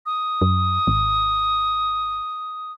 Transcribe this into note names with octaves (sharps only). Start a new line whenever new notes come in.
D#6
F#2
G#1